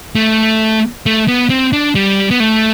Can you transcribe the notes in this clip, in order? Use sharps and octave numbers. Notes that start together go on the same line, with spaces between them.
A3
A3
B3
C4
D4
G3
B3
A3